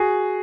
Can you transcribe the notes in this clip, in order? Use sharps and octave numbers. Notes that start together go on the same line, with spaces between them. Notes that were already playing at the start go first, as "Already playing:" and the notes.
Already playing: F#4 G#4